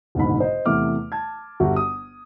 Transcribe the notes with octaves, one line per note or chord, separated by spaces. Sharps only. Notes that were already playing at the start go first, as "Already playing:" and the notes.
F#1 B1 G#2 D3 B5
C5 D#5
E2 C3 A3 E5 D6 F6
A5 G#6
G1 F#4 G4 E5
D#6